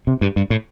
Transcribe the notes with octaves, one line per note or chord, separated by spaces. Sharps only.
C3
G2
G2
A2